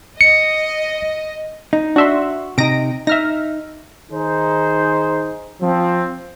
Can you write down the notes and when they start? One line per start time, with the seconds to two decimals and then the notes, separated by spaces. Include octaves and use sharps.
0.21 D#5 C#7
1.73 D#4
1.96 D4 F#4 E5 C6
2.58 C3 D#4 A#6 D7
3.07 D#4 E5 F6 A#6
4.11 D#3 D#4 G#4 C5
5.62 F3 C4